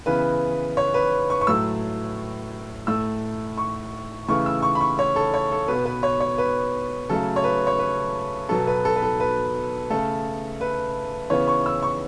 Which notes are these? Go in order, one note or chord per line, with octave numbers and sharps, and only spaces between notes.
C#3 E3 B3 B4
C#5
B4
C#6
C#6
A2 F#3 A3 E6
A2 A3 E6
C#6
C#3 E3 A3 C#6
E6
C#6
B5
C#6
C#5
A4
C#5
A4
B2 B3 B4
B4
C#5
C#5
B4
C#3 F#3 A3 A4
C#5
B4
C#5
B4
B2 F#3 B3 A4
B4
A4
B4
A4
B4
C#3 A3 A4
B4
C#3 E3 B3 C#5
C#6
E6
C#6